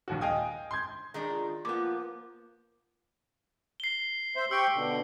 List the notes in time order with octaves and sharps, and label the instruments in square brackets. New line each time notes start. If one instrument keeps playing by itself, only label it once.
[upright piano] A#1 D#2 F#4
D#5 F5 G5 G#5 D#6
C6 G6 G#6
[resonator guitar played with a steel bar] D#3 G#3 D4
[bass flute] F4
[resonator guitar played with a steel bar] F3 B3 [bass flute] A#3 [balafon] F4 D6
[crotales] C7 G7
[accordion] C5 E5
[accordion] G4 G5 C#6 [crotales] E6
[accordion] B2 D3